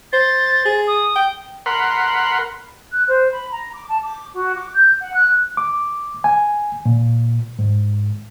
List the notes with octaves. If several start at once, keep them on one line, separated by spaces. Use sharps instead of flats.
C5 A6
G#4
D#6
G5
A#4 F#5 B5 C6
F#6
C5
B5
A#5
D6
A5
D6
F#4
D6
G6
F#5
F#6
D6
G#5
A#2
G#2